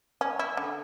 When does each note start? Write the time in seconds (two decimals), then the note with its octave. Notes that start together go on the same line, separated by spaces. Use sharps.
0.21 C#4
0.39 E4
0.57 D3